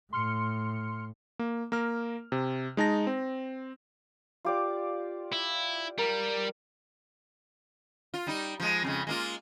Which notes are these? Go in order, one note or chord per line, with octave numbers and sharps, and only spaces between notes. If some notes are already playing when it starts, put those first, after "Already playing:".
A2 C6 F6 C#7
A#3
A#3 A#4 F6
C3
G#3 D#4 A5 A#6
C4
F4 G4 D5
E4
G3 A#4
F4
G3 D#4
F3 G#3
F2 C#3 G#3
G#3 A#3 F4